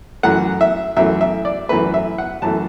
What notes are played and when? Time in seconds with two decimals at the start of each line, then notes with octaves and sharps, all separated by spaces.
0.23 F#2 E3 A3 F#5
0.61 E5
0.97 F#2 E3 A3 E5
1.21 E5
1.45 D5
1.69 F#2 E3 A3 B4
1.94 E5
2.18 F#5
2.42 F#2 E3 A3 A5